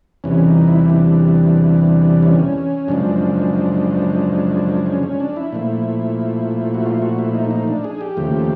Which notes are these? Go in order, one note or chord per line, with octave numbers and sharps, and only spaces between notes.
E2 C3 E3 G3 C#4
D#4
E4
D4
C#4
F#2 C#3 F3 G#3 D4
C#4
C#4
D4
E4
A#2 F3 A3
F#4
F4
F#4
E4
D#4
D#4
D4
G#4
G4
D#2 C#3 F3 A3